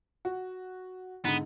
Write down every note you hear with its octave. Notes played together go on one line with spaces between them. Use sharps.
F#4
G#2 D3 B3